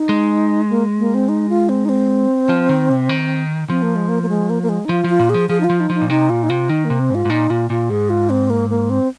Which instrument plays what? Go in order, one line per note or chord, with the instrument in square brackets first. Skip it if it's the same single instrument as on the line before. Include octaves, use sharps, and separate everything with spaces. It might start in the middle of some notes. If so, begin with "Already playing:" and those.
Already playing: [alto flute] D#4
[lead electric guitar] G#3
[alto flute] A#3
A#3
C4
D#4
F4
C4
D#4
C4
[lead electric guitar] F3
D#3
C3
D#3
[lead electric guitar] F3 [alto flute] C4
[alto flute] A#3
G#3
A#3
A#3
G#3
A#3
A#3
G#3
D#4
[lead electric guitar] F3 [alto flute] F4
[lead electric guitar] F3
[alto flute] F4
[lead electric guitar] A#2
[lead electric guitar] F3 [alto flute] G#4
[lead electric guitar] F3 [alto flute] G#4
[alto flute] D#4
F4
[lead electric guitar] F3
[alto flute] D#4
[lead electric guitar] F3
[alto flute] D#4
[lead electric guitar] A#2
[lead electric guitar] C3 [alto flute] D#4
[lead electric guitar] A#2 [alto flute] F4
[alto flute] D#4
[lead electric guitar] C3 [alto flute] F4
[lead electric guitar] D#3 [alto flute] D#4
[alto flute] A#3
[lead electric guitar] C3
[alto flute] C4
[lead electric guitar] G#2 [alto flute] F4
[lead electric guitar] G#2
[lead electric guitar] A#2 [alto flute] D#4
[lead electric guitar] A#2 [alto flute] F4
[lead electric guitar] A#2 [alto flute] F4
[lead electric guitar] G#2 [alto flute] G#4
[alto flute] F4
C4
A#3
A#3
C4